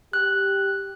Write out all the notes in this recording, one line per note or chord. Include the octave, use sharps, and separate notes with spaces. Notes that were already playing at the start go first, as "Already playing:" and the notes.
G4 F#6